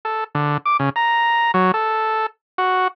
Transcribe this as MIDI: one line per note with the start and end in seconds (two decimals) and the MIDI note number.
0.05 0.24 69
0.35 0.57 50
0.66 0.77 86
0.80 0.90 49
0.96 1.51 82
1.54 1.71 54
1.74 2.26 69
2.58 2.88 66